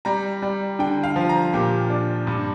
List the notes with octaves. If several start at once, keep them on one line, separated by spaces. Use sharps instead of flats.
G3 A#5
G3
D3 G5
F5
F3
A#5
A#2 G4
D4
G2